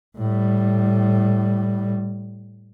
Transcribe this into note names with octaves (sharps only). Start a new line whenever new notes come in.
A2 G3